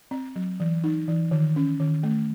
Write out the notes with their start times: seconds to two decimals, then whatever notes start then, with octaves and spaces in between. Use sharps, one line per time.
0.11 C4
0.36 F#3
0.60 E3
0.84 D#4
1.08 E3
1.31 D#3
1.56 C#4
1.80 D#3
2.03 A3